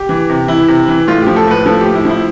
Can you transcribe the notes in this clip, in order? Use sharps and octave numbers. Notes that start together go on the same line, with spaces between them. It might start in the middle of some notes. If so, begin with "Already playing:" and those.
Already playing: G4
E3
C3
E3 E4
C3
E3
A2 F4
F3 G4
A4
A2 B4
F3 A4
A2 G4
E4
F3
E4